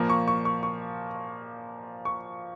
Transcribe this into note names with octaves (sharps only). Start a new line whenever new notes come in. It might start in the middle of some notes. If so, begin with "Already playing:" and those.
Already playing: A#2 F3 A#3
C#6
C#6
C#6
C#6
C#6